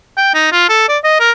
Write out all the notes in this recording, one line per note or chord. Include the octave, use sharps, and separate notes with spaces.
G5
D#4
F4
A4
D5
D#5
A#4